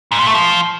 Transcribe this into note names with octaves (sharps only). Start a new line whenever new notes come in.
G#2
A#2
A3
F3